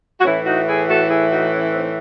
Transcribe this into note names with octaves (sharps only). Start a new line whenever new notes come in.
F#4
A2 E3 C#4 E4
D#4 F#4
E4 G#4
F#4 A4
E4 G#4
D#4 F#4
C#4 E4
C4 D#4